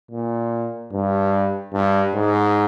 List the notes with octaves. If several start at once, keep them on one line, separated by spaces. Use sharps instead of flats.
A#2
G2
G2
G#2